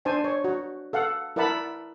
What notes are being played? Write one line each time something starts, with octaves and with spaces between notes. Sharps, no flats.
D4 C5 D5 G#5 A5
C#5
F#4
A4 F5 F#5
E4 A#4 D5 F#5 A5 B5